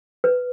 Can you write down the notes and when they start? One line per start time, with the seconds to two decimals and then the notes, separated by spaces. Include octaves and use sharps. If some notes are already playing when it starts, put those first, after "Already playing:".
0.24 B4